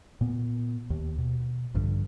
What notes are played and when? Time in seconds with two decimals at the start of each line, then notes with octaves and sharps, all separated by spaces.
0.21 A#2 B3
0.90 D#2
1.18 B2
1.74 A#1 G2 D3